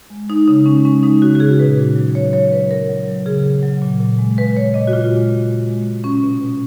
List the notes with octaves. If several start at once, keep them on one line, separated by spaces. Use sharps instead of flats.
G#3
G#3 D#4
C#3 D#4
G#3 C#4
G#3 C#4
G#3 D#4
C#3 F#4
F#4
C#3 G#4
A#2 B4
A#2
F#3
A#2 C#5
F#3 C#5
F#3 B4
F#3 A#4
F#3
F#3
C#3 G#4
F#3
F#3
A#2
A#2
G#3
G#3 B4
A#2 C#5
A#2 D#5
F#4
A#2 F4
G#3
A#2
A#2
G#3
G#3
B2 C#4
B2
B2